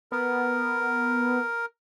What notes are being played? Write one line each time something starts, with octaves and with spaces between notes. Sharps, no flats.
B3 A#4